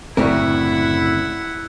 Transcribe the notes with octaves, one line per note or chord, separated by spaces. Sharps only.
F#1 D2 A2 A3 C4 E4 A#4 F#5